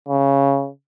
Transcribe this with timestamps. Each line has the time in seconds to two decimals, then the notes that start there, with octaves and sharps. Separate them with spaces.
0.09 C#3